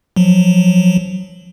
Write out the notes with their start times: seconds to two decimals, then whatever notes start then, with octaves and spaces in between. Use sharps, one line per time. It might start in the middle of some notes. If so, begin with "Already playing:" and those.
0.16 F3 F#3